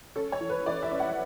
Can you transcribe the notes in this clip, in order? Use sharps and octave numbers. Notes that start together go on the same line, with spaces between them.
C#4 A4
C#5
E3
B4
E3 D5
E5
C#4
F#5